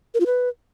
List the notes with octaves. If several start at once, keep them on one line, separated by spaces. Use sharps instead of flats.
A#4
F4
B4